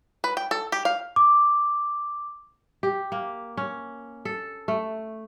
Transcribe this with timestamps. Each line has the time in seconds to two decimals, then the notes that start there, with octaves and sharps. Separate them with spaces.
0.24 B4
0.37 G5
0.51 A4
0.72 G4
0.85 F5
1.16 D6
2.83 G4
3.12 A#3
3.57 C#4
4.25 A4
4.68 A3